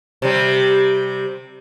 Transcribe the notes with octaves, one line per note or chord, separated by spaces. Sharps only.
C3 G3